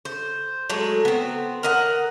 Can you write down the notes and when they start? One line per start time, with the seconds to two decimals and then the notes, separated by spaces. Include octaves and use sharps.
0.05 C5
0.70 F#3 G#3 A3
1.05 B3 C4
1.63 A#4 D#5 F#5